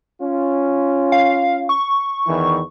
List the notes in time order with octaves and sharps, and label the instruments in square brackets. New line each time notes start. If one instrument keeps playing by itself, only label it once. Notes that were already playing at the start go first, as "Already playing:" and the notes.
[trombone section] C#4 F4
[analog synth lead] F5
C#6
[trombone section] E2 D#3 E3